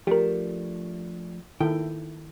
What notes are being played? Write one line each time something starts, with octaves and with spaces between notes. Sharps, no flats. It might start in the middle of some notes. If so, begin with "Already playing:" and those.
F3 A3 D4 G4 A#4
D#3 E4 A4 G5